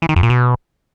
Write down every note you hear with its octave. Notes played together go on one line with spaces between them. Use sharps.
E3
D#3
F2
A#2
B2